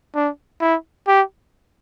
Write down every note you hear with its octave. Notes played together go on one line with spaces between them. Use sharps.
D4
E4
G4